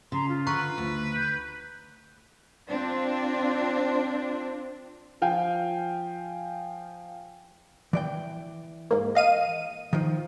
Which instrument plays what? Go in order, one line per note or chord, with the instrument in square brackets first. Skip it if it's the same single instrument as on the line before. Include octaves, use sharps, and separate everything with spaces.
[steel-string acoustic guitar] C#3 [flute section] A#5 C6
[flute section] F4
[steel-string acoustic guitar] D3 [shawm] B4 [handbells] A#5 C#6
[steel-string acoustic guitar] D2
[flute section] G6
[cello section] C4 D4 F4
[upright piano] F3 F5 G5 G#5
[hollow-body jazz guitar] E3 D5 G5
[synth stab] G#2 A#3
D#5 F5 D#7
[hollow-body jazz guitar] D#3 F3